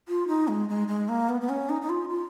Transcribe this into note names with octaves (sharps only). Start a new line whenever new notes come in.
F4
D#4
G#3
G#3
G#3
A#3
B3
B3
C#4
D#4
D#4
F4
F4